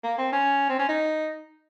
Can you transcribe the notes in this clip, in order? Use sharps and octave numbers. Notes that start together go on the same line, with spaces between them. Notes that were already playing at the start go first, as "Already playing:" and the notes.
A#3
C4
C#4
C4
C#4
D#4